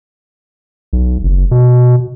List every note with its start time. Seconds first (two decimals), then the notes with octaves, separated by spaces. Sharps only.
0.93 B1
1.23 F#1
1.51 B2